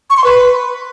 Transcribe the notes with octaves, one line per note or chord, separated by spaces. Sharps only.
C#6
C6
B4